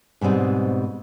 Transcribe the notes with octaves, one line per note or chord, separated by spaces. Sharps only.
G#2 B2 G3 C4 D#4